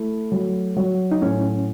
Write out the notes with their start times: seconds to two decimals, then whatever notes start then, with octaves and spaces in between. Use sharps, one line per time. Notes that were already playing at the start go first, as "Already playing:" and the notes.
Already playing: A3 E4
0.32 F#3
0.76 F#3
1.11 D#4
1.22 A2 C#4